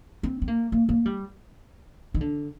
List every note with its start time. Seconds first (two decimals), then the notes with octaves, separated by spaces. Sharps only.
0.23 C4
0.42 C4
0.48 A#3
0.72 A#3
0.89 A#3
1.05 G3
2.14 D#3
2.21 D3